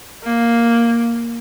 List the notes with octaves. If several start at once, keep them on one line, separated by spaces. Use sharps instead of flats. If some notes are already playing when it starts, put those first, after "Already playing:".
A#3